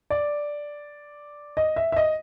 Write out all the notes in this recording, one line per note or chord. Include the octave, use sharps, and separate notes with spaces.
D5
D#5
E5
E5
D#5